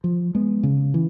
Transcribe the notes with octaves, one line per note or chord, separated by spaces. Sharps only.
F3
G#3 B3
C#3
E3